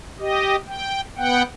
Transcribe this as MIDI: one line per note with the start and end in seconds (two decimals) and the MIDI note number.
0.20 0.56 67
0.20 0.56 75
0.68 1.01 79
1.17 1.43 59
1.17 1.43 78
1.17 1.43 79